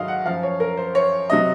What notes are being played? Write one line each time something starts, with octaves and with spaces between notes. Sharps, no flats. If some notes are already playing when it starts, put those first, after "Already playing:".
Already playing: G#2 D#3 F#3 D#5 F5
F#5
F#2 F3 F5
C#5
A#4
C5
C#5
C3 F#3 D#5